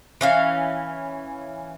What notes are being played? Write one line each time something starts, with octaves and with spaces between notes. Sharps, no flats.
E3 C#4 F5